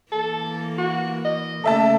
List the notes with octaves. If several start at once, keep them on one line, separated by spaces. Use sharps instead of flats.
E3 A#3 A4
F#4
D#5
C#3 A3 A#3 A4 E5 A5